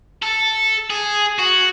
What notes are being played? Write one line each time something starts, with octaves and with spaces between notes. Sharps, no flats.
A4
G#4
F#4